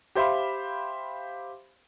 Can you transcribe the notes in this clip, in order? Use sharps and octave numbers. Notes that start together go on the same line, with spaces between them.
G4 C5 E5 F5 B5